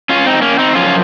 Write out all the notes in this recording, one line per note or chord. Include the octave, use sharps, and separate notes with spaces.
C#4 F4
C4 D#4
A#3 C#4
C4 D#4
F#2 F3 C#4 F4